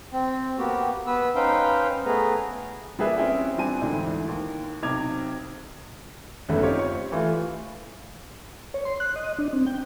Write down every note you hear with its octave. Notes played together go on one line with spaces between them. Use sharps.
C4
A#3 B3 F#4 G4
B3 B4 E6
C#4 D#4 B4 C5 F5 G5
A3 B3 G#4 B4 A#5
G3 A#3 G4 G#4 B4 E5
C4 C#4 E4 G#4 E5 G5
G3 C4 D4 G#5 D#7
D2 G#2 D3 E3
D#2
B1 C3 D6 G#6 F7
G#1 F#2 D3 A3 B3
C4 D#4 F4 G4 C#5
C#6
E3 A3 F4
C#5
C6
F#6
D#5
D4
C4
G5